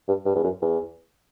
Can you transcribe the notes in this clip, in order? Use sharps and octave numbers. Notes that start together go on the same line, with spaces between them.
G2
G2
E2
F#2
E2